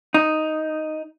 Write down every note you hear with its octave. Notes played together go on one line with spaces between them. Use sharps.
D#4